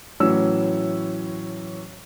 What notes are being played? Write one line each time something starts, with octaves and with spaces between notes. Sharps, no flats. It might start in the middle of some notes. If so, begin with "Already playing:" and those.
A2 E3 F#3 C#4 E6